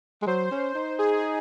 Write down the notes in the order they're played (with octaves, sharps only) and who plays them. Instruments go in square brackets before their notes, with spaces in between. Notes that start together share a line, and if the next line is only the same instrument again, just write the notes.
[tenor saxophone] G#3
[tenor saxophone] F#3 [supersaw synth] C5
[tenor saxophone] C#4
D#4
[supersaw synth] G#4